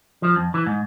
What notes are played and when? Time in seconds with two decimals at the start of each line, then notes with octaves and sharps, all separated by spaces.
0.22 F3
0.36 F2
0.54 E3
0.66 G#2